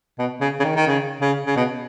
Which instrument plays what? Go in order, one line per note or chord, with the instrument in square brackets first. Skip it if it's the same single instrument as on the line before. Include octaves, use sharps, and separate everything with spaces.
[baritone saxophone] B2
C#3
C#3
D#3
D#3
C#3
C#3
C#3
B2